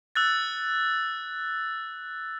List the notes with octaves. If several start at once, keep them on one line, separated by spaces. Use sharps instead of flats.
E6 F#6 A6